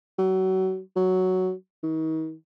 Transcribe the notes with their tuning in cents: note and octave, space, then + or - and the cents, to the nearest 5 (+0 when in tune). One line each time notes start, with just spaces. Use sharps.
F#3 +30
F#3 +5
D#3 +40